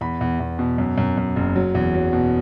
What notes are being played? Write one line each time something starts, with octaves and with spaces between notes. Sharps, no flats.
E2 B5
E2
E2
B2
F#2
F#2
F#2
F#1
F#3
E2
F#3
B2